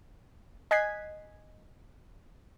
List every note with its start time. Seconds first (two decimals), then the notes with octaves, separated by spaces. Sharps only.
0.71 D#5 G#5 F#6 G#6 B6 C7